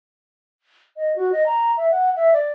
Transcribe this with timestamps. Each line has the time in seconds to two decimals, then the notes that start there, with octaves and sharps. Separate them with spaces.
0.97 D#5
1.16 F#4
1.32 D#5
1.46 A#5
1.77 E5
1.91 F#5
2.16 E5
2.33 D5